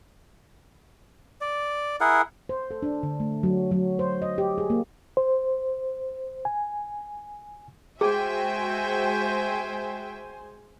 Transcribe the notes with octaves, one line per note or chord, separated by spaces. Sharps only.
D5
E4 G#4 A#4 F#5
C5
A4
D4
D3
A3
F#3
F#3
C5
D#5
G4
G#4
A#3
C5
G#5
G#3 F#4 G#4 C5 E5 G5 G#5